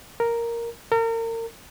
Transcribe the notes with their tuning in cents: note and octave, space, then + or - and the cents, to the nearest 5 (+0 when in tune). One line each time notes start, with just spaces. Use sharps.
A#4 +0
A#4 -35